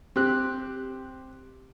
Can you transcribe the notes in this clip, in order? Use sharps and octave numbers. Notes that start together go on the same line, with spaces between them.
C4 G4 F#6